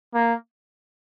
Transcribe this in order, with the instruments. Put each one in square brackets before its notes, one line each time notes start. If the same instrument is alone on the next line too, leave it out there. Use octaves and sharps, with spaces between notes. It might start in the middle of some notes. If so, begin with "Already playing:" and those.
[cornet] A#3